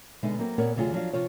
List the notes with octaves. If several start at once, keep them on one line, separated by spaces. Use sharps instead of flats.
B2 D3 G#3 D#4 E5
F#3 A#3 C4
A#2 B3 G4 A#4 C#5 F#5
D2 C3 F#3 F4 G#4
F3 F#3 D4 F5
C3 F3 F4 C5 C#5